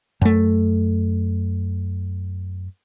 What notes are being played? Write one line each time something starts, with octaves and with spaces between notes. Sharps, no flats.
F#2 A3